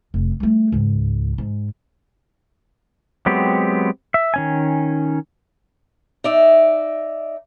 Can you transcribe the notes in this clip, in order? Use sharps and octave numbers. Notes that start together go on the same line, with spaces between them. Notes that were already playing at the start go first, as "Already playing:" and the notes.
F1
G3 A3
C#2 G#2
G#2
F#3 G#3 B3 C4 G4
E5
D#3 C#4 G#5
D#4 D5 E5